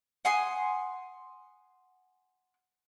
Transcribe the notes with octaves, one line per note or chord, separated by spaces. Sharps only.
F#5 G#5 C6 D#6